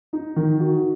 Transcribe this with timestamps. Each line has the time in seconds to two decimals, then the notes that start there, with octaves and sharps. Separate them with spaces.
0.13 D#4
0.36 D#3
0.59 F#4